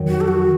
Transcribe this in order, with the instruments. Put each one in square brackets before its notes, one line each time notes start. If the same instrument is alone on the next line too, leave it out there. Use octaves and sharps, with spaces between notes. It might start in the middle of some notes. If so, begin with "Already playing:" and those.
Already playing: [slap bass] F2 D#3 F#3
[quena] F#4
A4
F#4